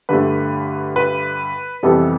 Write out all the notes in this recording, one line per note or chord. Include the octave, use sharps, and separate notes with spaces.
G2 D3 A3 B4
B4
F2 C3 E3 G3 B3 A4